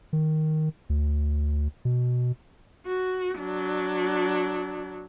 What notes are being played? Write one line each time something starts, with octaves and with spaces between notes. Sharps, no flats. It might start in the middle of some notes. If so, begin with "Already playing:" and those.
D#3
D2
B2
F#4
F#3 D4